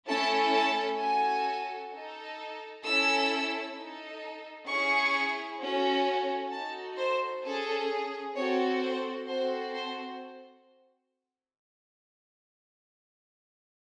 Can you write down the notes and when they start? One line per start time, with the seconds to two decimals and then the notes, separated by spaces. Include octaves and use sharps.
0.08 A3 C#4 E4 A4 A5
0.54 A5
1.00 C#4 F#4 A4 G#5
1.92 D#4 A4
2.85 C#4 E4 A4 E6
3.75 D#4 A4
4.67 C#4 E4 G#4 C#6
5.60 C#4 F#4 A4
6.51 D#4 F#4 A4 A5
6.97 C5
7.43 C#4 G#4 A4
8.35 C4 F#4 A4 C#5
8.82 C5
9.27 C4 F#4 A4 C5
9.74 C5